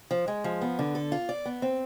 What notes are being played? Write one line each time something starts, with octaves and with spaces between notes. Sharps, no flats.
F3
G#3
F3
B3
D3
A4
F4
D5
B3
C4